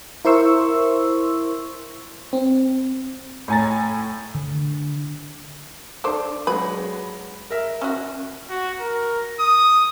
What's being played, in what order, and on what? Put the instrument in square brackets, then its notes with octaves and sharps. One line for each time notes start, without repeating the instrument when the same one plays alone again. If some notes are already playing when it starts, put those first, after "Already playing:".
[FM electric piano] E4 A#4 C5 C6 C#6 E6
C4
[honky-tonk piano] A2 C#5 G#5 A#5 A6
[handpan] D3
[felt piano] D4 D6 [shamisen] A4 C5
[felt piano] F#3 G#3 [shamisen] B4
[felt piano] A#4 E5
[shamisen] C#4 F#4
[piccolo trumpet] F#4
A#4
D#6